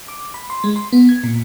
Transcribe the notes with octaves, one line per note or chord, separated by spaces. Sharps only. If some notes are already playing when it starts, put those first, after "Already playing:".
D6
B5
C6
G#3
C6
B3
G#6
A#2